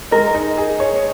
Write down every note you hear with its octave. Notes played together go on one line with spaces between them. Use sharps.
G#3 A#4
D#4
G#4
C#5